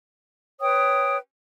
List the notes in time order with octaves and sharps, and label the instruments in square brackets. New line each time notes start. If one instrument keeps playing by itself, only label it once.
[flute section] B4 C#5 G5 D#6